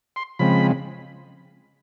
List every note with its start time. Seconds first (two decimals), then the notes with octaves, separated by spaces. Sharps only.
0.16 C6
0.39 C#3 F3 G#3 C4 B5